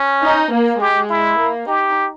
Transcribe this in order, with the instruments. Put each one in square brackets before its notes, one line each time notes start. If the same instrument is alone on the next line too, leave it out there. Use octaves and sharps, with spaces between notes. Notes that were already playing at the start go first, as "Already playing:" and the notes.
Already playing: [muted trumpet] C#4
[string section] D#4
A#3
[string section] G#3 [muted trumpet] G4
[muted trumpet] E4
[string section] A#3
[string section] D#4 [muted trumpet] G4